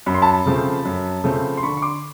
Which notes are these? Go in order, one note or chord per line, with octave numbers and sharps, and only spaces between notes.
F#2 B5
C6
A5 B5
C#3 F3 A3 C4
F#2
C#3 F3 A3 C4
C6
D3 B5 C#6
C#6
C6 D6